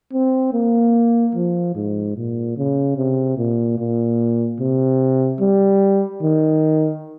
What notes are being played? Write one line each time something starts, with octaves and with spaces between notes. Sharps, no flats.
C4
A#3
F3
G#2
A#2
C#3
C3
A#2
A#2
C3
G3
D#3